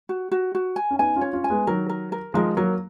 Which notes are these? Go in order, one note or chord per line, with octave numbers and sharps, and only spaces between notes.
F#4
F#4
F#4
G#5
C#4
B3 D#4 G#5
C#4 F4
C#5
C#4 F4
G#5
G#3 B3
D#3 F#3 A#4
A#4
A#4
F3 G#3 A#4
F#3 A#3 A#4